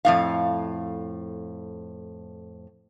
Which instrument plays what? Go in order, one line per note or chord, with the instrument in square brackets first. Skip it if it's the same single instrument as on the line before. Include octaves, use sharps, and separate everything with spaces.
[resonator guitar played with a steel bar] F2 A2 F5